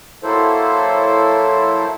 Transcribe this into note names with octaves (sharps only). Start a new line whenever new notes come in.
F#3 A#3 E4 A4 C5